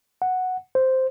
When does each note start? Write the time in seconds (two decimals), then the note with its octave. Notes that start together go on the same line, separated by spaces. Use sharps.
0.22 F#5
0.75 C5